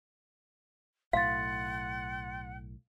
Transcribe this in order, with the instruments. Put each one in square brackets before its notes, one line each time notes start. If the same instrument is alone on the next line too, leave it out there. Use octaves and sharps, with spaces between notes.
[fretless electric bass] B1 A2 [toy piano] F5 [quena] F#5 [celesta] C6 A6